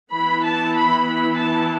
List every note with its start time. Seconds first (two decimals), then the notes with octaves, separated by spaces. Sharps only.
0.13 E3 B3 E4 B5
0.45 A5
0.77 B5
1.08 B5
1.38 A5